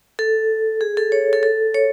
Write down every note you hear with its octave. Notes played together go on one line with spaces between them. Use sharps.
A4
G#4
A4
C#5
A4
A4
C#5